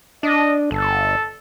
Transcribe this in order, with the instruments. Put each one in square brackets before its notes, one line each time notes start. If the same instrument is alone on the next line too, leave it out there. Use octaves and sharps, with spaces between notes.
[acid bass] D4 [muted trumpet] D#5
[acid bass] G1 [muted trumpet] A4